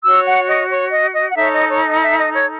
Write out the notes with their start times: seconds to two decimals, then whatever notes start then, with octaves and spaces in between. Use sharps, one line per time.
0.03 F#4 C#5 E6
0.25 F#5
0.47 D#5
0.69 C#5
0.91 D#5
1.14 D#5
1.30 F#5
1.35 D#4 A4 C#5 E5
1.52 D#5
1.69 C#5
1.85 D#5
2.02 E5
2.18 D#5
2.34 C#5